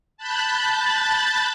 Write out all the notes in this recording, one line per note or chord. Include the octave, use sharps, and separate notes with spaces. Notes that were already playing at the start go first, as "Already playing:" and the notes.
A5 B5 F#6 G6 A6